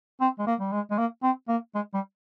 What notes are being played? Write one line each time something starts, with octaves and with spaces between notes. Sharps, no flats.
C4
G#3
A#3
G3
G#3
G#3
A#3
C4
A#3
G#3
G3